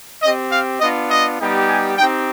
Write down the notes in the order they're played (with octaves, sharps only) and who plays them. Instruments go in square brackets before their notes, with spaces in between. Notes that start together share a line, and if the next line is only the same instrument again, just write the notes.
[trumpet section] C4 G4 D#5
F5
B3 D4 F4 D#5
D#5
G3 B3 D#4 G4
G#5
C4 D#4 G4 G5